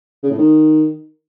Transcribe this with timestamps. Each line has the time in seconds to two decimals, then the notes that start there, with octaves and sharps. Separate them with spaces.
0.23 C#3
0.31 A2
0.38 D#3